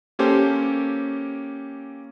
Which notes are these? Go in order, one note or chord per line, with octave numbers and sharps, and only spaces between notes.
A#3 C#4 G4 A4 C5